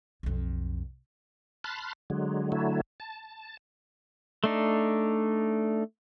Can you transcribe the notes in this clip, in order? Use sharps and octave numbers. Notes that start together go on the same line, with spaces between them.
B1 F2
A5 B5 C6 F6 F#6
D3 F#3 G#3
D3 F#3 A3 E4
A5
A3 D4 D#4